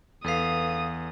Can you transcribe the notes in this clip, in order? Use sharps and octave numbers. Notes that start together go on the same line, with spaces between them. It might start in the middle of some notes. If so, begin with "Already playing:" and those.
E2 A4 B4 F5 D#6 C7